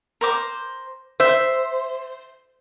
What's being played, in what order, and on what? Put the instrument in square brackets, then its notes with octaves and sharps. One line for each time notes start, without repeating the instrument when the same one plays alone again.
[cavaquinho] A#4 C5 D6
[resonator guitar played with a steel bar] C5 [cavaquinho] E5